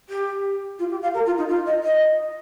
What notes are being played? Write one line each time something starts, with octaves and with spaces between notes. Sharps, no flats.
G4
F4
G4
F5
A#4
F4
D#4
F4
D#5
D#5